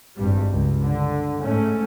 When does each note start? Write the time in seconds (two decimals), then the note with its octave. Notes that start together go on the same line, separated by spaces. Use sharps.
0.16 G#1 G2 G3
0.52 C#2
0.82 D3
1.42 G#2 A3 C#4